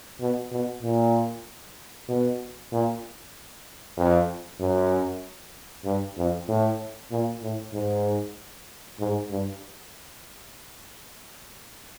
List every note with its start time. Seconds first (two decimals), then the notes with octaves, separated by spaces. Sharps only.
0.20 B2
0.51 B2
0.82 A#2
2.08 B2
2.72 A#2
3.97 F2
4.60 F#2
5.85 G2
6.17 F2
6.48 A2
7.11 A#2
7.43 A2
7.73 G#2
8.99 G#2
9.30 G2